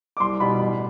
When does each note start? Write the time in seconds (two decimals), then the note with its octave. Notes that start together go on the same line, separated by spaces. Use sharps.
0.17 D6
0.20 C2 C6
0.40 B2 G3 B5
0.61 A1